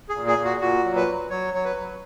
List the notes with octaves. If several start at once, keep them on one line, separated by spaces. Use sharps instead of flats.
G#4
A#2
G#4
A#2
F#4
A#2 F#4
F#3
B4
F#3
F#3 C#5
F#3 C#5
B4
F#3